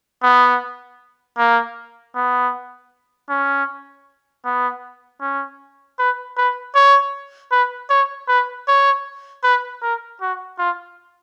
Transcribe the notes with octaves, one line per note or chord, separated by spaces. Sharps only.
B3
A#3
B3
C#4
B3
C#4
B4
B4
C#5
B4
C#5
B4
C#5
B4
A#4
F#4
F4